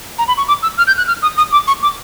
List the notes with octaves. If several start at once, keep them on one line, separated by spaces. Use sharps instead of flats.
A#5
B5
C#6
D6
E6
F6
G6
F#6
F6
D#6
D#6
D6
C#6
D6